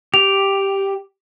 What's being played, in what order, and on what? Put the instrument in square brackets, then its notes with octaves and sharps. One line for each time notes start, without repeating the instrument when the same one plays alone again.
[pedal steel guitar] G4 [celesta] F7